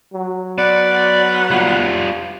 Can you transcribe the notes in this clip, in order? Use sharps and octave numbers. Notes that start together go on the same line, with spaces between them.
F#3
B3 D5
G3 F4